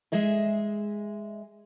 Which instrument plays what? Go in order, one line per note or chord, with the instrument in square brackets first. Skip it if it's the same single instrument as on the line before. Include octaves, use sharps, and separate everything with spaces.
[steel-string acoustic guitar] G#3 G#4 D#5 E5